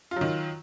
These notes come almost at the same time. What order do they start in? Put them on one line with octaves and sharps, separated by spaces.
F4 F#3 D#3